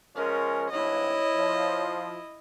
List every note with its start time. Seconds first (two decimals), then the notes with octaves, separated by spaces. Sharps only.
0.16 F3 G#3 C#4 A#4
0.71 G#1 G2 E4 C#5 D#5
1.35 F3